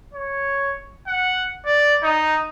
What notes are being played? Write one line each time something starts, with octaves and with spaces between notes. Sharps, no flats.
C#5
F#5
D5
D#4